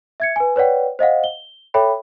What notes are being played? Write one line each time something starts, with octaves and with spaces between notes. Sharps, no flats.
E5 G#6 C#7
B4 G#5
B4 C#5 D5 F#5 G5
C5 D#5 F5 F#5
G7
A4 C#5 E5 G5 B5